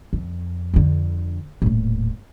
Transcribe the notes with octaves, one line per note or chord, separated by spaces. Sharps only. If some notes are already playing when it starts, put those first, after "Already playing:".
F2
F2 D3
D#1 A2